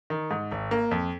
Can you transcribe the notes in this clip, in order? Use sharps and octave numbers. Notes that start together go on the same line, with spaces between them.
D#3
G#2
G#1
A#3
F2